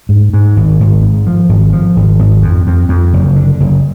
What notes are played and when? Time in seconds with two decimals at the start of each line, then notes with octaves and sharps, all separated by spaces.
0.09 G#2
0.33 G#2
0.56 G#1
0.80 G#1
1.02 G#2
1.27 F3
1.49 G#1
1.73 F3
1.96 G#1
2.19 G#1
2.42 F2
2.67 F2
2.89 F2
3.13 F#1
3.36 D3
3.60 F#1